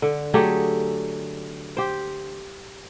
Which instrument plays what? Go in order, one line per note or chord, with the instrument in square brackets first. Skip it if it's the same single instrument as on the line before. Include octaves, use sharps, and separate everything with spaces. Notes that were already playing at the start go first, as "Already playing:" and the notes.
[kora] D3
F#3 A3 G4 G#4
G4 C5